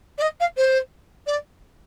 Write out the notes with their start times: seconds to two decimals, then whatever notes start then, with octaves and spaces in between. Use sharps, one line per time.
0.18 D5
0.21 D#5
0.40 F5
0.57 C5
1.26 D5